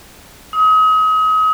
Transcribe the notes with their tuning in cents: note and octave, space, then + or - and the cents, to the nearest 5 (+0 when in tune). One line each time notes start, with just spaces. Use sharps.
D#6 +35